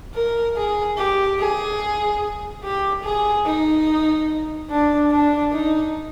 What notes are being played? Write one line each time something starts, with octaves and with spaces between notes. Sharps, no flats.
A#4
G#4
G4
G#4
G4
G#4
D#4
D4
D4
D#4